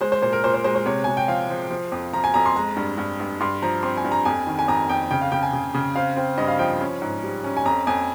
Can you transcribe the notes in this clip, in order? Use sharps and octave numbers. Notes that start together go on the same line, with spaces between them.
G#3 C5
C5
A#2 C5
A#4
A#2 C5
C5
G#3 C5
C5
C3 C#5
C3 G#5
G5
F3 F5
F3
F3
F2
F3 A#5
G#5
F2 A#5
C6
G#3 A#5
G2
G2
G2
G2 C6
F3 A#5
C4 C6
G#5
G2
A#5
F2 G#5
D#3
G#5
F2 A#5
F2 G5
C#3 G5
F5
C#3 G5
G#5
C#3
C#3
C4 F5
C4
G2 D#5
F5
F3 G5
C#4
G#2
G3
C#4
G#5
F2 A#5
F2 G#5